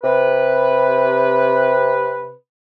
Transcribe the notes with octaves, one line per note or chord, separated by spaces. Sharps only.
C3 B4